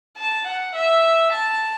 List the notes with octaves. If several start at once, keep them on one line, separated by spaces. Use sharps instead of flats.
A5
F#5
E5
A5